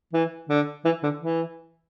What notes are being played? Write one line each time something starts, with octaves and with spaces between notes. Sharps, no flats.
E3
D3
E3
D3
E3